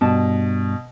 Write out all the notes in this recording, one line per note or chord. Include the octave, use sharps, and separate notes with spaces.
G2 B2 A5